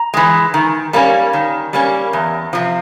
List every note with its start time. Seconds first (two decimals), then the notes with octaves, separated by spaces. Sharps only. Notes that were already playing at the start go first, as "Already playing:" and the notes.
Already playing: A#5
0.14 E3 G#3
0.54 D#3
0.93 G3 A#3 C#4
1.33 D#3
1.73 G3 A#3 C#4
2.13 E2
2.53 C3 F3